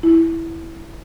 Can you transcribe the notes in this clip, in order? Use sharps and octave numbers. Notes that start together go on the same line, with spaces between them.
E4